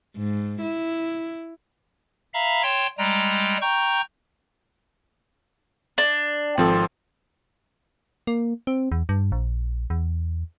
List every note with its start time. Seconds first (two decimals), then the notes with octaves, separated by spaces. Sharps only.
0.16 G#2
0.62 E4
2.34 E5 F5 A#5 B5
2.63 C#5 G5 A5 C6
2.98 G3 G#3 G5 A#5
3.62 G5 A#5 C#6 G6
5.98 D4
6.57 G#1 F3 C4 A4
8.27 A#3
8.67 C4
8.92 E2
9.09 G2
9.32 A#1
9.90 E2